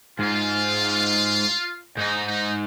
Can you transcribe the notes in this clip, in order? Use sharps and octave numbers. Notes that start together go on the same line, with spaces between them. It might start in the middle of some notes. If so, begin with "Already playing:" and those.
G#2 F4
G#2 D#4
D#4